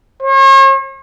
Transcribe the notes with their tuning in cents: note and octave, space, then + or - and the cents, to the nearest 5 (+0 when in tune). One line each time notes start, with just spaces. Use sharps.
C#5 -45